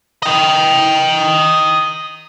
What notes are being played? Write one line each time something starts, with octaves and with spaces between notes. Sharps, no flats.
D#5 G5